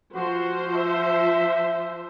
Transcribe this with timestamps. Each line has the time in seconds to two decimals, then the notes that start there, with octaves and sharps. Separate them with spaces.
0.15 F3 F#4 C5
0.74 E5